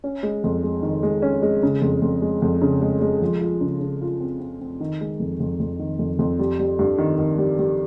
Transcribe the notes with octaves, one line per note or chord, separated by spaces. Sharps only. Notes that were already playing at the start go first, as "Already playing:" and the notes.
C#4
G#3
F2
G#3
D#3
G#3
C#4
G#3
C#3
F2
F2
G#3
F2
C#3
G#3
G#3
F3
F4
C#3
C#3
F4
C4
C4
C4
D#3
G#3
F2
F2
F2
D#3
F2
F2
G3
G3
G2
D#3
D#3
G3
G3